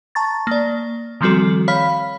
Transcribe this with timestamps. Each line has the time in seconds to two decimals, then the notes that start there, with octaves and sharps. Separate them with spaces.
0.15 A5 A#5 C#6 A6
0.47 A#3 D5
1.21 D#3 F3 G3 C4 F#4 A4
1.68 C#5 F5 B5 F6 B6